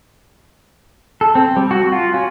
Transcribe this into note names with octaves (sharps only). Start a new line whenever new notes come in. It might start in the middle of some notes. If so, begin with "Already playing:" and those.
A4
C4
G3
F#4
F4
C#4